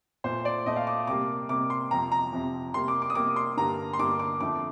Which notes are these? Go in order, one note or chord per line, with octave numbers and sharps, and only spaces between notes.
A#2 A3 C5
D5
A#2 A3 D#5
F5
D6
C3 G3 A#3 D6
C3 G3 A#3 D6
C6
F2 C3 G3 A#5
A#5
F2 C3 G3
C3 G3 A#3 C6
D6
D6
D#6
C3 G3 A#3 D6
C6
G2 D3 G3 A#3 A#5
C6
G2 D3 G3 A#3 D6
D6
F2 D3 A3 D6